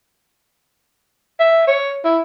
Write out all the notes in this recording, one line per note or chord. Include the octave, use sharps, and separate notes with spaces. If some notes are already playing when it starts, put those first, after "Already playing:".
E5
C#5
E4